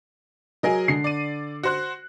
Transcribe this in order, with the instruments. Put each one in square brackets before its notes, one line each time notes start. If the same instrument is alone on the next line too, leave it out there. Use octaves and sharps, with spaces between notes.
[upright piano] F#3 [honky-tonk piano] G#4 A#4 D#5
[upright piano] D3 C7
[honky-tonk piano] D5 D#7
F#4 C5 F#6